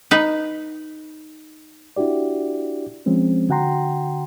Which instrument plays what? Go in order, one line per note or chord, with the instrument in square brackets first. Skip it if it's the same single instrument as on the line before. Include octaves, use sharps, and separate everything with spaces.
[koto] D#4 B4
[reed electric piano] D4 E4 F#4 G4 D5
F3 G#3 C4 C#4
D3 F#4 F#5 G5 A#5 C6